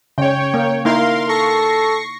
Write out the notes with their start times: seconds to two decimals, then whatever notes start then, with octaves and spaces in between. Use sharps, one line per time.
0.18 C#3 C#5 G5
0.54 A#3
0.85 A#3 D#4 E4 A#4 F5 C6
1.29 A4 C#6 A#6 C7